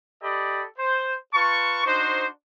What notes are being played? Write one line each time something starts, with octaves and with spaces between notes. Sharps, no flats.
G4 A4 D5 D#5 B5
C5
F4 B4 A5 C#6
D4 D#4 F#4 C5